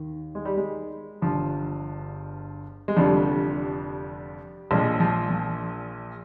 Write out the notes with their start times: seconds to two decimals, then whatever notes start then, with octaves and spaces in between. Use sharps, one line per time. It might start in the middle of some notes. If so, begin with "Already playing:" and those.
Already playing: D#2 D#3
0.35 G#3
0.45 G3
0.57 G#3
1.22 G1 G2 F3
2.88 G#3
2.96 F1 F2 D3 F3 G3
4.71 A#1 A#2 F3 G#3
5.00 F3
5.29 F3